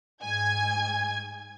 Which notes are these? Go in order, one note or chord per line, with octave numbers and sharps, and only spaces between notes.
G#2 G#5 G#6